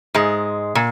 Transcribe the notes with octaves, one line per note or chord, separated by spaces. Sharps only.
G#2 G#3
A#2